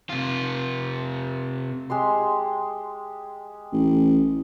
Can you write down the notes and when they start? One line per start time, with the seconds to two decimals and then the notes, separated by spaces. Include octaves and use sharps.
0.10 C3 F4
1.90 G#3 G4 C6
3.72 A1